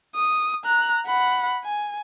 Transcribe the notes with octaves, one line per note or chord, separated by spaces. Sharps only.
D#6
A#5 F#6
F#5 B5
G#5